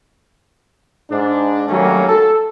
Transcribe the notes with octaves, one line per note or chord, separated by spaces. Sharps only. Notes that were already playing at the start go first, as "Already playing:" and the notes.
G#2 D4
D#3 F#3 G3 A3 A#3 C#4
A4